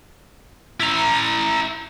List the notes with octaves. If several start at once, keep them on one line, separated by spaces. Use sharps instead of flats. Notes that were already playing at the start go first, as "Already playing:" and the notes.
E4 A#5